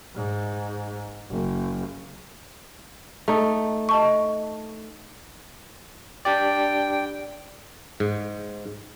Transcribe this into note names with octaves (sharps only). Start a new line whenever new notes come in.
G#2
F#1
A3 D#4
D#5 A5 C#6
D4 G4 D5 G5
G#2